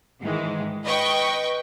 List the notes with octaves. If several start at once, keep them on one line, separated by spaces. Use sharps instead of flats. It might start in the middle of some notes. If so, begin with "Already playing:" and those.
G#2 D#3 E3 G#3
B4 D#5 G5 C#6